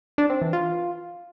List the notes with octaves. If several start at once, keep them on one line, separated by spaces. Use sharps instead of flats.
D4
C4
E3
F4